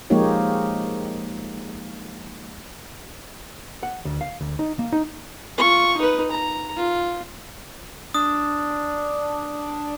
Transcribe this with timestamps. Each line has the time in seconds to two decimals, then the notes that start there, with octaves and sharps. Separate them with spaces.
0.10 F3 G#3 A#3 D#4 G4 C#5
3.83 F#5
4.05 D2
4.21 F5
4.41 D2
4.59 D#4
4.79 A#3
4.93 D#4
5.58 F4 C#6
5.97 D#4 B4
6.31 A#5
6.76 F4
8.14 D4 D#6